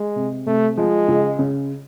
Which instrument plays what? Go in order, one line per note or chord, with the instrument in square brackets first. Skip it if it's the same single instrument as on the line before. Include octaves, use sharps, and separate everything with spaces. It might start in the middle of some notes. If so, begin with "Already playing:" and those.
Already playing: [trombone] G#3
[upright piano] C3
[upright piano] C3 [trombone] A3
[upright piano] F3 [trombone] G#3
[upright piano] C#2
C#3